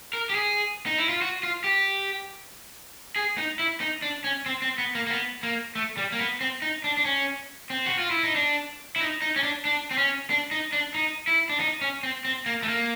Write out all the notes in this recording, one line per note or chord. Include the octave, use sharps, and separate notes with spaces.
A#4
G4
G#4
D#4
E4
F4
F#4
F4
G4
G#4
D#4
E4
D#4
D4
C#4
C4
C4
B3
A#3
A#3
B3
A#3
A3
G3
A#3
B3
C4
D#4
D4
D4
C#4
C4
F#4
F4
E4
D#4
D4
E4
D#4
D#4
C#4
D4
D4
C4
C#4
D4
D#4
D4
D#4
E4
D4
D#4
C#4
C4
C4
A#3
A3
A#3